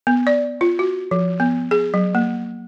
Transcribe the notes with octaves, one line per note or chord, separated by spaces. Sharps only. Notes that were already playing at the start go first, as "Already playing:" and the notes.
B3
D5
F4
F#4
F3
B3
G#4
F#3
A#3